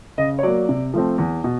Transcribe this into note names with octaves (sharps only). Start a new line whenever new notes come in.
C#3 D#5
C#5
F#3 A#3 D5
C3
F3 A3 C4
E2
B2